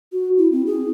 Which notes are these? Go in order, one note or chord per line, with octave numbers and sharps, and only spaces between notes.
F#4
E4
C4
G#4